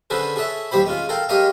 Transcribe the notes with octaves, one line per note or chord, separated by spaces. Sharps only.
D3 C#4 G#4 A4 B4 C5
G#4 A4 C#5 E5
D#2 G3 G4 C5 B5
G#3 C#4 F4
A4 A#4 F5 G5
G#3 G4 A#4 C#5 D#5 F5